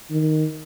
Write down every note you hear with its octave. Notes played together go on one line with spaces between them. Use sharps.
D#3